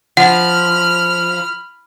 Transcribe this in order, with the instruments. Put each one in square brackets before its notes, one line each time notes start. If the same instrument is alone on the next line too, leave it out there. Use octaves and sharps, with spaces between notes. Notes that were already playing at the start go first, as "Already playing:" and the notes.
[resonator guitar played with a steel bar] F3 [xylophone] F#5 [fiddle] B5 F6